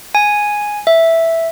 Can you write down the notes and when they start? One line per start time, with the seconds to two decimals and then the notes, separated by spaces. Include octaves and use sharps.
0.15 G#5
0.87 E5